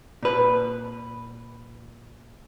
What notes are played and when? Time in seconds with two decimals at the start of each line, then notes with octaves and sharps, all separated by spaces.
0.23 A#2 B4